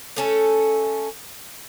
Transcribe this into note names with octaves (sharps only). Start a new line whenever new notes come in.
A3 C#4 A4